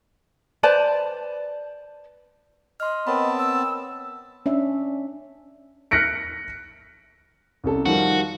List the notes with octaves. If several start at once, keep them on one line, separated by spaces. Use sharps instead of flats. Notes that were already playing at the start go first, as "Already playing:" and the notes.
B4 C5 D5 A5
D#5 C6 F6
B3 C4 A#4 C#5 A5 B5
E6
C#4 D4 E5
F6 F#6 A#6 B6 C#7 D7
C2 C#4 A4
D#3 F3 G3 F#4